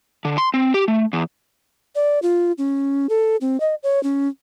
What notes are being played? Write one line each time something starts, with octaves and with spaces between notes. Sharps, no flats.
D3
C6
C4
G4
A3
E2
D5
F4
C#4
A4
C4
D#5
C#5
C#4